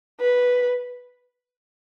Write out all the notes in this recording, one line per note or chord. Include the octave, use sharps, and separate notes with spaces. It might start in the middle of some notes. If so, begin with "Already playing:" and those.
B4